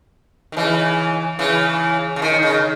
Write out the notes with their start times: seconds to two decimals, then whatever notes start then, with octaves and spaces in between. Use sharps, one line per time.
0.52 D#3
0.56 C#3 E3
1.39 C#3 E3
2.16 C#3
2.22 D#3
2.43 C#3